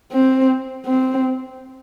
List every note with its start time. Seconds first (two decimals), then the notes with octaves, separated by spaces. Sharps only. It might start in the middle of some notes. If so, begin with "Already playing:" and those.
0.13 C4
0.86 C4